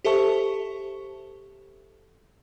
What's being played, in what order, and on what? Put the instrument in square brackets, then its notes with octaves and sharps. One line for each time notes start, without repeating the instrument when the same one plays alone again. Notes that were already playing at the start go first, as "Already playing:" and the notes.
[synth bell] G4 A4 C5 E5 A5 C#6